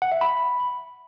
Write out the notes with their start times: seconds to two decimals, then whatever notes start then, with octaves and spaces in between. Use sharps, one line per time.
0.02 F#5
0.12 E5
0.21 B5